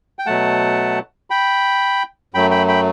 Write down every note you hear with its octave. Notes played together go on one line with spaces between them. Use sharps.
G5
B2 F#3 A3 F#5 A5
G5 B5
F#2 F#3 A3 G5 B5
G5 B5
G5 B5